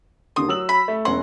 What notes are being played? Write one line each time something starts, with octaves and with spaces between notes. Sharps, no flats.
D#2 D3 C6 D#6
F#3 E6 F#7
B5
A3
E1 C#4 F#5 C6